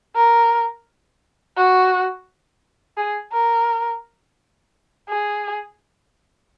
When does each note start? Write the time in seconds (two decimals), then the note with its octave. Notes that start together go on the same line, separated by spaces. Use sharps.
0.16 A#4
1.57 F#4
2.97 G#4
3.32 A#4
5.09 G#4